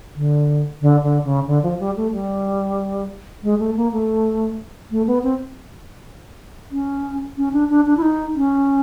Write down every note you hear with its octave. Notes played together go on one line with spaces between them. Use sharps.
D3
D3
D3
C#3
D3
F3
G3
A3
G3
G#3
A3
A#3
A3
A3
B3
C4
C#4
C#4
D4
D4
D4
E4
D#4
C#4